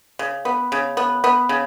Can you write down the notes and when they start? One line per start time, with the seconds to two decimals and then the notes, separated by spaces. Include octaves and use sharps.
0.19 C#3
0.45 B3
0.72 C#3
0.97 B3
1.24 B3
1.49 C#3